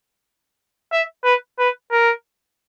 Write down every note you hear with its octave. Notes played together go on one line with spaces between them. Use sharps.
E5
B4
B4
A#4